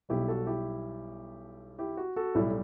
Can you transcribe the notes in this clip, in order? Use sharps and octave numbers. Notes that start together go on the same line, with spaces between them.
B1 B2 G3 E4 G4
F#4 A4
E4 G4
E4 G4
F#4
F#4 A4
B1 A2 G3 E4